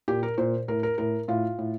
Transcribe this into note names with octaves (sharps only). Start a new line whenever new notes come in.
A#2 G4
A#4
A#2 C5
A2 A#4
A#4
A2 A#4
A2 F4
A2